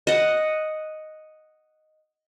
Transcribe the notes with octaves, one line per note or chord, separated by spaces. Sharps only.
D#5 F#5